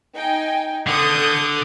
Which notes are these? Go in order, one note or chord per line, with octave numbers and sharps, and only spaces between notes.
D#4 G5 G#5
D3 A4 D#6 G6